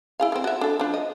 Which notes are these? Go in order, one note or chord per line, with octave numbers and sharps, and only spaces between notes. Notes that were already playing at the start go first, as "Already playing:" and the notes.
E4 G#4 F5
D#3 C4
F#4 E5
D4 A4
F3 D4
D#5